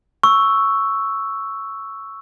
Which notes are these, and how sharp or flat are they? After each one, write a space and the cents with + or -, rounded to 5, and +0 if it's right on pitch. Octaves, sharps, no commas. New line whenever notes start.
C#6 +0 E6 +0